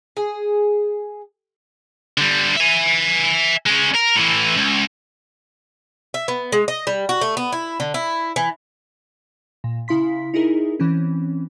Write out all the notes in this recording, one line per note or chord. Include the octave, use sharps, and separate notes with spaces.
G#4
D3 G3
E5 G#5
G#3 C#4
A#4
A2 E3
C#2
E5
B3
G#3
D#5
G3
F#4
A3
B3
E4
D3
E4
E3
A#2
C#3 E4 F5 C6 B6
D#4 E4 G#4 A#4
E3 C4 C#4